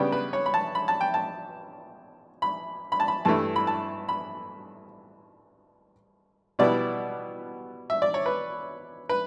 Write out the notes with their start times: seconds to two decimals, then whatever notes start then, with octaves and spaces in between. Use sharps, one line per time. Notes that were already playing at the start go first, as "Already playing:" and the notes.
Already playing: C#3 G3 B3 D4 G5
0.12 B4
0.33 C#5
0.46 B5
0.54 A5
0.75 B5
0.88 A5
1.01 G5
1.14 A5
2.42 B5
2.92 B5
3.00 A5
3.08 B5
3.25 G2 E3 A3 E4 A5
3.56 B5
3.67 A5
4.09 B5
6.59 B2 G3 B3 E4 D5
7.90 E5
8.02 D5
8.14 C#5
8.26 B4
9.09 B4